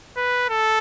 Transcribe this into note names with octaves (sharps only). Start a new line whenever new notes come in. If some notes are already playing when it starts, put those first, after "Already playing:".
B4
A4